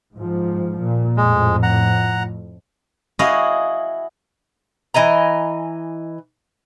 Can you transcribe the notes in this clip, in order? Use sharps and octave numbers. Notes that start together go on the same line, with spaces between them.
G#2 F3
A#2
F2 A2 G#3
F#5 A#5
E4 F#4 G#4 D#5 F5
E3 D#5 G#5 A#5